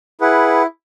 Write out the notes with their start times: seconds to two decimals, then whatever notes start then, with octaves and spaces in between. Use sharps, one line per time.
0.21 E4 G#4 B4 F#5